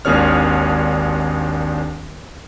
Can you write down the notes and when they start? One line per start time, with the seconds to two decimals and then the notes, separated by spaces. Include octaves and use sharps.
0.05 G#1 D#2 D4 G#4 C#5 F6